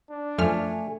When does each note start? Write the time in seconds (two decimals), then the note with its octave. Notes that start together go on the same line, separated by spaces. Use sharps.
0.10 D4
0.38 F#2 F3 A3 G#5 F6